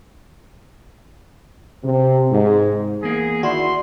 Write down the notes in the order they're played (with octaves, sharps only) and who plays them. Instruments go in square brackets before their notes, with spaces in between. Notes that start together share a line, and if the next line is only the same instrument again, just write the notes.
[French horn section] C3
G#2
[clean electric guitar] E2 A#3 [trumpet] G#4
[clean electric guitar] D#3 E4 [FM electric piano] F#4 [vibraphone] D5 [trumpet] C6